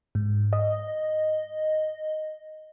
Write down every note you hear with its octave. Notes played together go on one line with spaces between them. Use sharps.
G#2
D#5